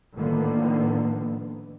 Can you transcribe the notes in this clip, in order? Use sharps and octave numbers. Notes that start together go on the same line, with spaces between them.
A2 D3 D#3 F3 A#3 B3